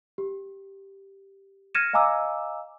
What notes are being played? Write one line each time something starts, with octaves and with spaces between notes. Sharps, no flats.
G4
F6 G#6 A#6 C#7 D#7 E7
D#5 F5 G#5 A#5 D6 E6